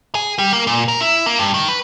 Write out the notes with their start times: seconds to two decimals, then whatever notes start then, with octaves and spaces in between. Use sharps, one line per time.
0.15 G#4
0.38 G3
0.53 A#3
0.67 A#2
0.88 A#4
1.01 E4
1.26 A#3
1.39 G2
1.54 D#3
1.69 B4